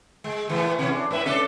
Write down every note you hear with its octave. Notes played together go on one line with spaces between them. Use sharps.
G#3
A2 E3 A3
C3 E3 C#4
D4
G#2 B4 E5
C#4 D4 A4